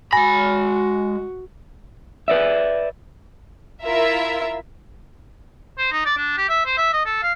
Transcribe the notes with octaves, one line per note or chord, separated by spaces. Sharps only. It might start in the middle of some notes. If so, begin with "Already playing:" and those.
G#3 F#4 G#5 B5 A#6
B4 D5 E5
E4 F4 A#4 E5
C5
D#4
D5
D4
G4
E5
C5
E5
D#5
A4
F5